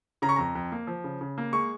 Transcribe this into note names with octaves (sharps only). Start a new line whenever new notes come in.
C#3 A#5
C#6
F2 A#5
F2
A#3
F3
C#3
C#3
A#3
G#3 C#6